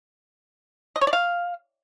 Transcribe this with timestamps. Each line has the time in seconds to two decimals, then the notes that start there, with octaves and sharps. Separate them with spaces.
0.96 D#5
1.01 C#5
1.07 D5
1.13 F5